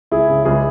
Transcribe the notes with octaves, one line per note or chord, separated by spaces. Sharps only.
C#2 E4 G#4
C#3
C#2 E4 G#4